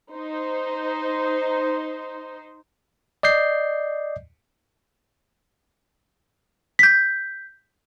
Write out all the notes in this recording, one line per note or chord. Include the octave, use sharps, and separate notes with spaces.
D#4 C5
D5 D#5 G6 C7
G6 B6